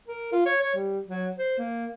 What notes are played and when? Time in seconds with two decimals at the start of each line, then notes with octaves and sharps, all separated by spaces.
0.08 A#4
0.32 F4
0.46 C#5
0.61 C#5
0.75 G3
1.08 F#3
1.38 C5
1.58 A#3